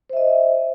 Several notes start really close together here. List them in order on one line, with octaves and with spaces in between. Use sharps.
C5 E5 D#5